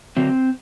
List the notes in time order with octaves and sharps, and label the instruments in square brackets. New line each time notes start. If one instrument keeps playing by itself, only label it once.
[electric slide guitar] D3 F#3 A#3 C4